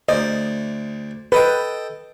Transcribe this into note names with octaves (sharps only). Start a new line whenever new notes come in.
D2 C5 D5 D#5
A4 B4 D#5 G5